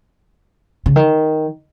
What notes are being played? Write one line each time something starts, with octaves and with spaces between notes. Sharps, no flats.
C#3
D#3